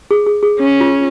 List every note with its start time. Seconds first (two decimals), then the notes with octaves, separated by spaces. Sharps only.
0.11 G#4
0.26 G#4
0.43 G#4
0.59 C#4
0.80 F4